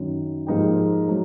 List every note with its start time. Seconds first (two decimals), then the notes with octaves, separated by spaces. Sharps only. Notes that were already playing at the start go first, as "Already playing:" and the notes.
Already playing: F#2 D#3 F#3
0.47 G#2 F3 A#3 D#4 G4
1.08 F#3 A3